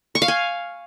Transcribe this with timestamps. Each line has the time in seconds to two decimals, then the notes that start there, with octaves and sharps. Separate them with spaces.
0.15 C#6
0.22 F5
0.28 G#5